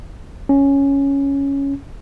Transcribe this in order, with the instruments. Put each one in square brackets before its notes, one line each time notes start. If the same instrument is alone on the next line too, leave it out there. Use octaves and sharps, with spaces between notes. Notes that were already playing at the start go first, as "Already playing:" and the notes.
[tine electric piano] C#4